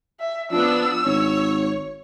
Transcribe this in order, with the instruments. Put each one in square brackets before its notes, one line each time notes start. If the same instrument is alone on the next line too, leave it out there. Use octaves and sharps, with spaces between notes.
[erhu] E5
[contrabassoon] F3 [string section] B3 D4 [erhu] E6
[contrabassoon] G#1 [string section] C#5